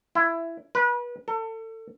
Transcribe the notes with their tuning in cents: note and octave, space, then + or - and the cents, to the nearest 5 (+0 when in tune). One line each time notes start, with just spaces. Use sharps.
E4 +15
B4 -30
A4 +30